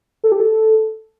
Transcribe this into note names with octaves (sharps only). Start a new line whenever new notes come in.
A4
G4
A4